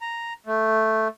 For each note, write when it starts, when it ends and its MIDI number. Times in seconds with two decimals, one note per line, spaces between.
0.01 0.33 82
0.46 1.08 57